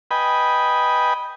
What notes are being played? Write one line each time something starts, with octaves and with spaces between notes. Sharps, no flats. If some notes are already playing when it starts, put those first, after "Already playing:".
B4 D#5 G5 G#5 B5